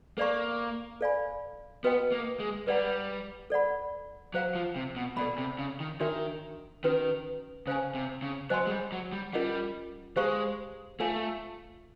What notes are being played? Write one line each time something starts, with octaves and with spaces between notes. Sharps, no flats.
A#3 A4 D5 F5 A#5 C#6
A4 D5 F5 G#5 B5
B3 F#4 B4 D#5 G5
A#3
G#3
G3 B4 D5 F#5 A#5
A4 D5 F#5 B5
F#3 C5 F5 A#5
F3
C3
B2
B2 A4 D5 F#5 B5
C3
C#3
D#3
D#3 D4 F#4 A#4 C#5 E5
D#3 C#4 F#4 B4
C#3 C5 F5 G#5
C3
C#3
F#3 C5 D#5 G#5 C6
G#3
G3
F#3
G3
G3 C#4 F4 A#4 D#5 F#5
G#3 G4 C5 F5 A#5 C#6
A3 F4 A4 C#5 F5 G#5